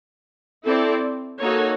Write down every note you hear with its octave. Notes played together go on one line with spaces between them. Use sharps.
C4 E4 A4 D5
A#3 D#4 F#4 A4 C#5